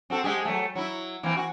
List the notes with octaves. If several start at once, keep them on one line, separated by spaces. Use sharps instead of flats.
C4 F#4 A4
G#3 G4 G#4
F#3 A3
F#3 E4
E3 A#3 C4
F#4